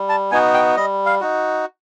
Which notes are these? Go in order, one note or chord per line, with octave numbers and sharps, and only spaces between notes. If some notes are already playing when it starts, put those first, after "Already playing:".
Already playing: G3
A5
B3 D#4 F#4 G#5
G5
G3 D#5
F5
D#4 F#4